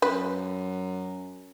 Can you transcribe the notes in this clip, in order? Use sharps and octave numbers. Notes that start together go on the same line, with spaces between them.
F#2 B4